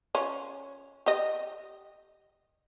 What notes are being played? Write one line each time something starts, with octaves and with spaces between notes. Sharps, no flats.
C#4 F4
G4 D#5